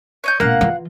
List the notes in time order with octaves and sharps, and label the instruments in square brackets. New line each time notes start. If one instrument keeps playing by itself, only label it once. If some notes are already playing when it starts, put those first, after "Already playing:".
[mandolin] C#5 D#5 G6
[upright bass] E1 A#2 [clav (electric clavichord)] A#3 [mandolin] F5 F#5
[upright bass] E3 F4